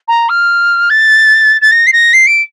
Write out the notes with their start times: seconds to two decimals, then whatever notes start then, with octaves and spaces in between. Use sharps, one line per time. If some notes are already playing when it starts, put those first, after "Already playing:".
0.08 A#5
0.29 F6
0.89 A6
1.61 A6
1.71 A#6
1.86 C7
1.92 A#6
2.13 C7
2.26 D7